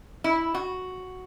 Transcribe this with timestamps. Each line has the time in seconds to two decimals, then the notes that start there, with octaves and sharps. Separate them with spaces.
0.24 E4
0.54 F#4